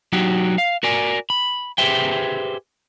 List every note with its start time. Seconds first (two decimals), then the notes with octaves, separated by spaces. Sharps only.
0.13 F#3 D#4 F#4 G4
0.58 F5
0.83 F#4 A#4 D5 G#5
1.30 B5
1.78 G4 G#4 B4 C5 E5 G5